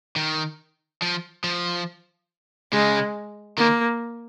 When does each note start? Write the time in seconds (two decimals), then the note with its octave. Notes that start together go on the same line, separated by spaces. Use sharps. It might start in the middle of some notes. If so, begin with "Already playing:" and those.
0.16 D#3
1.02 F3
1.44 F3
2.73 C#3 G#3
3.58 D#3 A#3